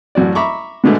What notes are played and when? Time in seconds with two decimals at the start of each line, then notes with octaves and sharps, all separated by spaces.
0.15 A1 F#2 F#4 D5
0.35 E5 A#5 B5 C#6 D6
0.84 G#2 B2 D3 G#3 A3